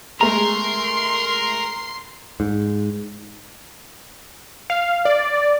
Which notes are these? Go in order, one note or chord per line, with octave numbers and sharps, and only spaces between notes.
G#3 A3 G#4 A#4 A#5 C6 C7
G#2
F5
D5